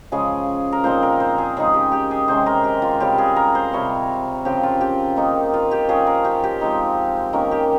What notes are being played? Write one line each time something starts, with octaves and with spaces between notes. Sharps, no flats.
C#3 F3 G#3 G#4
A#4
A#2 F3 C4 D#4 C5
A#4
C5
G#4
C#3 G#3 D#4 G#4
G4
G4
G#4
C3 D#3 G#3 C#4 C5
A#4
G4
F4
C#3 G3 C4 G4
G#4
A#4
C5
C3 G3 C4 C#5
C#3 F3 C4 G4
F4
G4
D#3 A#3 D#4
F4
G4
F3 A#3 C#4 G#4
A#4
G4
G4
F3 G#3 C4 D#4
D#3 A#3 C#4 A#4
G4